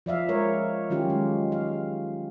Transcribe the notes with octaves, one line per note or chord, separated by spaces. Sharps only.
F3 D5 E5 F5
G#3 A#4 C#5
D#3 F#3 C#4 F4 G4
G#3
F5